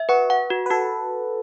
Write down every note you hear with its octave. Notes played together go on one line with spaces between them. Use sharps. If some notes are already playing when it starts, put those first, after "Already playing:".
Already playing: E5
F#4 B4
F#5
F#4
B4
F#4 A4